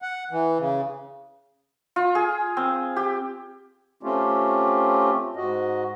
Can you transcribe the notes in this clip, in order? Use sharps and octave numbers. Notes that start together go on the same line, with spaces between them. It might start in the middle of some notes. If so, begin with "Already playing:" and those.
F#5
E3
C#3
F4
G#4
C4
G4
A3 C4 C#4 F4 G4
G#2 F#4 D#5